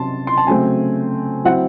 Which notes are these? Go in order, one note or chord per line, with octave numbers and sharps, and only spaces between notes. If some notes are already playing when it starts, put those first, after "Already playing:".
Already playing: C3 F#3 C#4 A5 C6
C6
A5
C#3 F#3 A3 C4 G#5
F#3 C4 E4 F#5